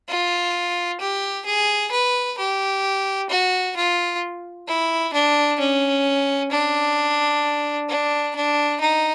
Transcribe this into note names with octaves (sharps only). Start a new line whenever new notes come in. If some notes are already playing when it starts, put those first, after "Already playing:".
F4
G4
G#4
B4
G4
F#4
F4
E4
D4
C#4
D4
D4
D4
D#4